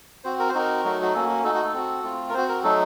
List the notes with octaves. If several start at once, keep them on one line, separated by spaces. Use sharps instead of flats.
C4 F#4 C5
A#4
C5
C4 D#4 F#4 A#4
F#3 A3 D#4 F#4
F#4
A#3 C#4 F#4 A4
F#4
A3 D#4 F#4 A4
F#4
A4
C4 F#4
A3 C4 F4
A#4
C4 F#4 C5
A#4
F#3 A3 D#4 A4